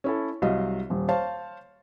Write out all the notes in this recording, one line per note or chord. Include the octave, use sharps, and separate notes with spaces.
C#4 E4 A4
C2 F#3 D#5 F5
D#1
C5 C#5 F5 A5